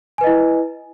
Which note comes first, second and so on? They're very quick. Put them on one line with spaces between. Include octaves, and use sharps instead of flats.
G#5 B4 D#5 E4